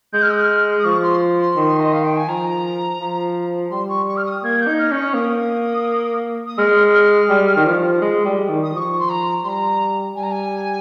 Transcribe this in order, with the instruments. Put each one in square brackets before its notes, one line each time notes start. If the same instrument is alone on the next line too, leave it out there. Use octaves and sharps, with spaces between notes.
[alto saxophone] G#3 [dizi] G6
[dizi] F6
D#6
G6
F6
D#6
[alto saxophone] F3 [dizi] C#6
[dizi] C6
C6
[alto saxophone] D#3
[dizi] D#5
F5
G5
G#5
[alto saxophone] F3 [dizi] A#5
[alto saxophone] F3
[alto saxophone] G3 [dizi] C6
[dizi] C#6
C#6
F6
D#6
[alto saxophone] A#3 [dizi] G#6
[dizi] G6
[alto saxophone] D#4
[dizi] F6
[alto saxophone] C#4
[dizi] C#6
[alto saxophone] A#3 [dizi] D#6
[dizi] D#6
[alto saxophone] G#3 [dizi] F6
[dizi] F6
[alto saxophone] G3
D#3
F3
G#3
G3
D#3
[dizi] D#6
[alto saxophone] F3 [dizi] D#6
[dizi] C#6
C6
A#5
[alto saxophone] G3 [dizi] A#5 C6
[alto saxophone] G3 [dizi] G#5
[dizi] A#5
G#5